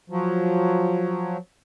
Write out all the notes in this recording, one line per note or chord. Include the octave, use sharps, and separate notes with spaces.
F3 F#3